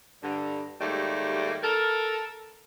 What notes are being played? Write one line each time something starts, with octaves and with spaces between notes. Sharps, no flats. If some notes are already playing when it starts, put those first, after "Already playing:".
G2 D3
D#2 G#2 G3 A3
A4 A#4